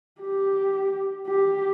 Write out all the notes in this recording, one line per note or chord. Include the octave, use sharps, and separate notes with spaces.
G4
G4